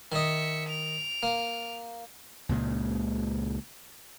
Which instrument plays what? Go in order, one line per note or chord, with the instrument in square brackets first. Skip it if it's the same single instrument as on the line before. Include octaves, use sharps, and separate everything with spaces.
[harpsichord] D#3 D#5 [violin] E5 C#7
[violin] D7 F7
[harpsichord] A#3
[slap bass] C#2 A#2 C#3 G#3